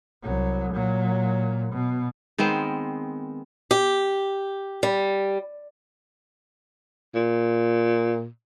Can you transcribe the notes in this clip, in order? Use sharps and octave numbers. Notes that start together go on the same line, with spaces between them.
C2 F#3
A#2 F#3
B2
D#3 G#3 B3 C4
G4
G3
A#2